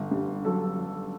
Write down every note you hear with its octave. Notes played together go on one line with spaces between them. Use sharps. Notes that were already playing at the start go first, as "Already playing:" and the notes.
Already playing: G1
G2
F#3 A4
F#3